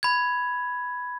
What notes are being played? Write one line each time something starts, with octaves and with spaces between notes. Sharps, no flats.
B5 G#6